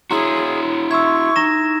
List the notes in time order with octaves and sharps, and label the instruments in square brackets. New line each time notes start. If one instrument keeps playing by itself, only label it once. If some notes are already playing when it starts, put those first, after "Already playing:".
[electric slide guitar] E4 F#4 [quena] G#4 [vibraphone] C#5 [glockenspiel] A#5 C6
[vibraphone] E5 C6 [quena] C#6 [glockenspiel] E6 G#6
[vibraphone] D#4 [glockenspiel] A#5 A#6 E7